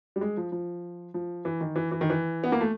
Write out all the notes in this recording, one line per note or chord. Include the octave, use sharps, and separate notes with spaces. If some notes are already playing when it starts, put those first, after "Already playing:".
G3
G#3
F3
F3
F3
E3
D#3
E3
E3
D#3
E3
B3
A#3
A3